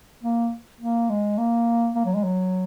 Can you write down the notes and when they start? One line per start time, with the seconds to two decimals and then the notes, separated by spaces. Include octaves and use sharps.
0.23 A#3
0.80 A#3
1.09 G#3
1.38 A#3
1.95 A#3
2.05 F#3
2.15 G#3
2.24 F#3